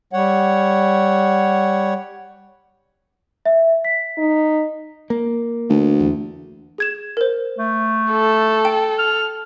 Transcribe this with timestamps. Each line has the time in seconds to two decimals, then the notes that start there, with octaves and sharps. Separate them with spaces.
0.13 G3 C#5 F#5
3.46 E5
3.85 B6
4.18 D#4
5.10 A#3
5.70 D2
6.00 E2
6.78 G#4 G#6 E7
7.17 A#4 C5
7.59 A3
8.11 A4
8.65 G5
8.99 F6